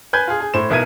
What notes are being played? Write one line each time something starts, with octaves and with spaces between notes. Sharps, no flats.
B4 G#5 G6 G#6
F4 G#4
G#4
A2 C5 E7
B1 B2 E4 A#4 G#6 D#7